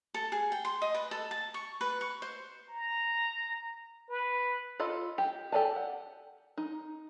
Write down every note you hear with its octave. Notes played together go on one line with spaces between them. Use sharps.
A4
G#4
G5
C6
D#5
B4
A4
A5
C#6
B4
C#6
C5
A#5
B4
F4 A4 D#5 B5
G4
G4 A4 D5 G#5 A5
F#5
D#4